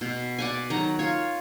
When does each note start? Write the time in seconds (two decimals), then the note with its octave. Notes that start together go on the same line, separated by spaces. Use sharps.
0.01 B2
0.39 D5 F#5 G#5
0.70 D#3 F#3 F#5 A#5
0.99 F4 C#5